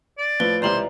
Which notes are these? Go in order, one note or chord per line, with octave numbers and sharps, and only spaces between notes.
D5
A2 F3 B4 G7
C#2 C3 E3 C5 D5 A#5 F#7